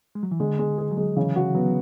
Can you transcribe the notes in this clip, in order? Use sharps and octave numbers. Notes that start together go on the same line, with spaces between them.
G#3
F#3
E3
D3 G#3
G#3
G#4
F#3
G#3
C#3 E3
F#4
F#3 B3